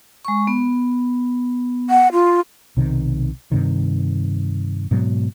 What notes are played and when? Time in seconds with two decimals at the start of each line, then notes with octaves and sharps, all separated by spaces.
0.25 G#3 C#6
0.47 B3
1.90 F#5
2.13 F4
2.77 B1 C3 D#3
3.52 G2 C3 D#3
4.91 G#2 B2 F#3